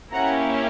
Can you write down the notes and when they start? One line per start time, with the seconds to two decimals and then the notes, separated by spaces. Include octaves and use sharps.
0.12 A#3 C#4 E4 G4 F#5 A#5